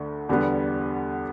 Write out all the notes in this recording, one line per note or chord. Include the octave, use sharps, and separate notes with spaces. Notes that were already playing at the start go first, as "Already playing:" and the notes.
Already playing: D2 D3 A3
E2 D3 G3 B3